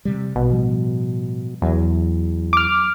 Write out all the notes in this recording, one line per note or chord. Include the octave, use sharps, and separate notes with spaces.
C3 G3
A#1 B2
A2 F3 G3
E2 F#3
D6 F6